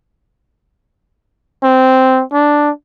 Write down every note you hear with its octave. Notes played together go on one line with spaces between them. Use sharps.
C4
D4